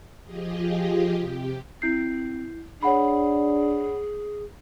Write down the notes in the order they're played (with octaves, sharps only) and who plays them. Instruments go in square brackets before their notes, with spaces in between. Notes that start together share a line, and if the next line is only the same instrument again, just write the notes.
[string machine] F3 F4 G4 G#4 D#5
C3 G4
[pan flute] C4 [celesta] E4 G6 C7
[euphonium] D4 [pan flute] G#4 [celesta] C#5 F#5 B5